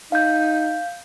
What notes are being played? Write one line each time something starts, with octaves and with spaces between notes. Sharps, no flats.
D#4 F5 G6